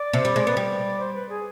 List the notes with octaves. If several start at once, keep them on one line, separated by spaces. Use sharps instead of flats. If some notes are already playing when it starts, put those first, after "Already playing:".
Already playing: D5
C3
G3
G#3
B3
G3
C5
B4
G#4